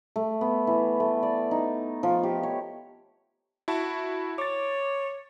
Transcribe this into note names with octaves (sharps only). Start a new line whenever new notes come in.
A3
B3
E3
A3
D5
D#4
F3
G4
C#5
E4 F#4 A5
C#5 D6 A6